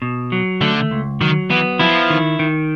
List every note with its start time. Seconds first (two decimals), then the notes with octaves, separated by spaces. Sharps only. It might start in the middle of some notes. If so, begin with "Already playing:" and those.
0.02 B2
0.32 F#3
0.61 D3 A3
0.91 C#2
1.21 D#3 F#3
1.50 E3 B3
1.79 F3 E4
2.10 D#3
2.39 D#3